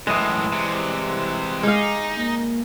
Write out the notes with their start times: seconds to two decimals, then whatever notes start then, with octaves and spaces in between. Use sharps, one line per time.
0.07 F#2 A2 E3 G#3 D#5 F#6
0.52 C2 C3
1.63 G#3 D#4 F5 D6
2.17 A#3